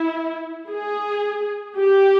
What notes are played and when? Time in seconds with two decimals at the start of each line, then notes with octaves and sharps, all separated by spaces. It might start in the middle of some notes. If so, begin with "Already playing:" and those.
Already playing: E4
0.69 G#4
1.77 G4